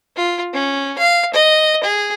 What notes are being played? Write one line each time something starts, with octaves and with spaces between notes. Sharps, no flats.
F4
C#4
F5
D#5
G#4